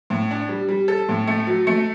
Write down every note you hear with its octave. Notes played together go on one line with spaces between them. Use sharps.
A2
D4
G3
G3
A4
A2
A3
F#3
A3